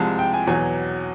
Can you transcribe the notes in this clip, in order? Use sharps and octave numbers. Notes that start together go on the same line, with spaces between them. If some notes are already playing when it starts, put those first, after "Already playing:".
Already playing: C2 C3 F3 G#3 A5
G5
G#5
E2 B2 F#3 G#5